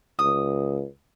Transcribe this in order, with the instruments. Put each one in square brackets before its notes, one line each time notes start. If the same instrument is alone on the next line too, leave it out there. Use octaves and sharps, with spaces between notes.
[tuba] C#2 [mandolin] D#6